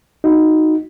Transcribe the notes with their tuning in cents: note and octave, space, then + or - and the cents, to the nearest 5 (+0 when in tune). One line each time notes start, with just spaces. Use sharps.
D#4 +0 F#4 +0